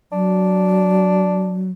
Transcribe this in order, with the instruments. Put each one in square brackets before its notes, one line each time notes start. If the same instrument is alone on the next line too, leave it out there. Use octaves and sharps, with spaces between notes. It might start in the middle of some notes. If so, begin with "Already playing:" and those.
[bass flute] F#3 [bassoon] D4